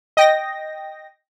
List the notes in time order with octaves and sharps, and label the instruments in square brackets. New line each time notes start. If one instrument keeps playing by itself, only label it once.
[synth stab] D#5 G5 A#6